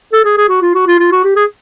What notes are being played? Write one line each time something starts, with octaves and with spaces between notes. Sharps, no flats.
A4
G#4
G#4
F#4
F4
F#4
F4
F4
F#4
G4
G#4